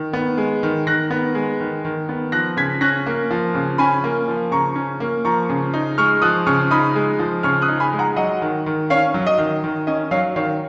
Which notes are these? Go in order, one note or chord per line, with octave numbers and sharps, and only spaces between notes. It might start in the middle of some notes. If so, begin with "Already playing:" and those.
Already playing: D#3
B3
G#3
D#3
D#3 F#6 A#6
B3
G#3
D#3
D#3
B3
F3 F#6 A#6
C#3 G#6 B6
C#4 F#6 A#6
A#3
F3
C#3
C#4 G#5 B5
A#3
F3
C#3 A#5 C#6
C#4
A#3
F3 A#5 C#6
C#3
D#4
G#3 C#6 F6
F3 D#6 F#6
C#3 C#6 F6
D#4 B5 D#6
G#3
F3
C#3 C#6 F6
D#6 F#6
D#4
G#5 B5
G#3
F#5 A#5
F#3 D#5 F#5
D#3
D#3
C#4 C#5 F5
F#3
D#5
D#3
D#3
C#4 D#5
F#3 C#5 F5
D#3 C#5 F5